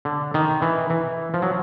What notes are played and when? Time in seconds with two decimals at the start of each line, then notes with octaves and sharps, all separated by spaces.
0.05 D3
0.34 D#3
0.62 E3
0.90 E3
1.34 F3
1.42 F#3